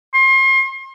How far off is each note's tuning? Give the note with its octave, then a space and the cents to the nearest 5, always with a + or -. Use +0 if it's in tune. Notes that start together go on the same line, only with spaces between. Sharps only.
C6 +35